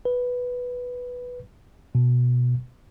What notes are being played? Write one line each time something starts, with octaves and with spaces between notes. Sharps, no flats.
B4
B2